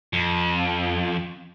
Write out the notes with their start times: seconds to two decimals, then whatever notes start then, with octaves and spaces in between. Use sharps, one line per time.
0.13 F2